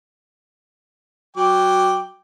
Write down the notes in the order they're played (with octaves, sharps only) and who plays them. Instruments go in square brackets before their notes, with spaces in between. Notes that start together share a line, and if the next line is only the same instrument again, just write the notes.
[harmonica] F#3 G5 D6